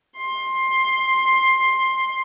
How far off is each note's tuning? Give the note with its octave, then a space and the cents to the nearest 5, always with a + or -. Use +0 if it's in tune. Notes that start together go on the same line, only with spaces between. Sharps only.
C6 +15